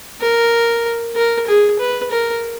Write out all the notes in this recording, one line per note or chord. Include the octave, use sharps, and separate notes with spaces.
A#4
A#4
G#4
B4
A#4